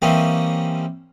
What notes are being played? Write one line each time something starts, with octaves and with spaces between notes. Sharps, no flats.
E3 G3 A#3 C4 C#4 D#4